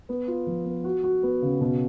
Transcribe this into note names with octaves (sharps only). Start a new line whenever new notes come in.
B3
F4
F3
B3
F#4
F#4
B3
C#3
B2